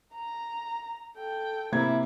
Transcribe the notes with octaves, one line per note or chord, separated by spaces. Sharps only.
A#5
A4 G5
C3 A#3 E4 G#6